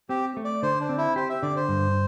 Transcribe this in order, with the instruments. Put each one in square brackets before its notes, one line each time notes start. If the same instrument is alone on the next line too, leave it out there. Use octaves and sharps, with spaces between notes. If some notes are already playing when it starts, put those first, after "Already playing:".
[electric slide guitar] C4 [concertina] G4
[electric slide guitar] A3
[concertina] D5
[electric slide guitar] D3 [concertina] C5
[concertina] D4
[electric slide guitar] C4
[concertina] E4
[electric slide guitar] G4 [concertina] C5
[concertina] E5
[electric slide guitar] D3 [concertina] D5
[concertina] C5
[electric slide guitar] G2